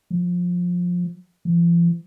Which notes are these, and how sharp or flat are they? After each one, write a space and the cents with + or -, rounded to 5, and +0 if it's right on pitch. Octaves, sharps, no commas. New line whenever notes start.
F3 +20
F3 -45